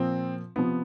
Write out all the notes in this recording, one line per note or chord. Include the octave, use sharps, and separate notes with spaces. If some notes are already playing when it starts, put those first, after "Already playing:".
Already playing: A#2 F3 C4
C3 F3 B3